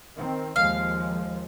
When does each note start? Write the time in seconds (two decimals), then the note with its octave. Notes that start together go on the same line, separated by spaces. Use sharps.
0.17 D#3 C4
0.56 D#2 F3 G#3 F5